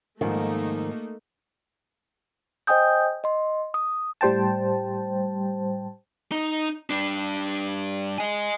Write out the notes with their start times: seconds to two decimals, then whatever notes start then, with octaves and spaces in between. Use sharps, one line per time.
0.21 G#2 D#3 F3 A3 A#3 D#4
2.67 C5 D#5 G5 G#5 D#6 G6
3.24 D#5 C6
3.74 D#6
4.21 A2 G3 C5 G5 A5
6.31 D#4
6.90 G3 D4
8.18 D#5 G#5